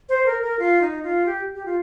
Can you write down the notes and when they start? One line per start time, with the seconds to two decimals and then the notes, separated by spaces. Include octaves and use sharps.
0.09 C5
0.26 A#4
0.43 A#4
0.59 F4
0.82 D#4
1.03 F4
1.26 G4
1.55 G4
1.65 F4